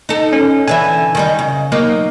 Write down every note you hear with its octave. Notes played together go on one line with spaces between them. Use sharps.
D#4 A4
C#4
D3 E3 E5 G#5
D#3 G3 D#4
C#3
F#3 A#3 D#4